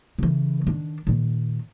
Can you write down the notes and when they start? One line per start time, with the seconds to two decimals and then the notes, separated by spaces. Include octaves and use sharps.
0.19 C#3 E3
0.67 D#3 D4
1.07 A#2 D#3